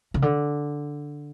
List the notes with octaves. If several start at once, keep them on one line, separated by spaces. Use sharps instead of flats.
C#3
D3